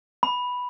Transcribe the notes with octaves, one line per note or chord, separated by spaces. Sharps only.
B5